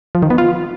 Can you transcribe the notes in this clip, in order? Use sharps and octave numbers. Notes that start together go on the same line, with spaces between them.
F3
D#3
B3
F4